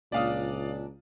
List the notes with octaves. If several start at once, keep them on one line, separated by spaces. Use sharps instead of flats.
C#2 A#2 D4 D5 F5 D#6